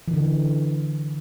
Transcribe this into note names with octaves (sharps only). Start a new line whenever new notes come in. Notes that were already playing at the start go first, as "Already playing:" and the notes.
E3
D3